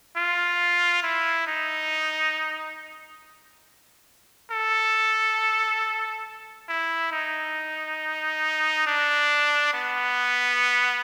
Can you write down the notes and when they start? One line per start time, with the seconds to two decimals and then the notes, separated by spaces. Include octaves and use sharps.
0.17 F4
1.03 E4
1.47 D#4
4.51 A4
6.69 E4
7.12 D#4
8.86 D4
9.73 B3